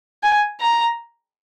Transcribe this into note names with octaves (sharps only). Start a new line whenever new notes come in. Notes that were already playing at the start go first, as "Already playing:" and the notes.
G#5
A#5